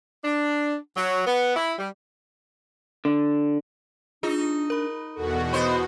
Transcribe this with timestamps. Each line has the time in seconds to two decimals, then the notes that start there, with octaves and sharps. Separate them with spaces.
0.24 D4
0.96 F#3
1.27 B3
1.56 E4
1.79 G3
3.05 D3
4.23 D4 D#4 F4 G#4
4.70 A#4 B5
5.15 E2 B2 F#4 A4
5.52 B3 C5 D#5